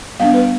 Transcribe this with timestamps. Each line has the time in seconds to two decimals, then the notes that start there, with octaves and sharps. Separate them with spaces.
0.20 G3 B3 D4 F5
0.34 B4